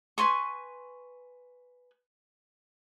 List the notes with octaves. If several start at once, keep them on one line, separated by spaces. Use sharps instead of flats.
B4 G#5 C6 C#6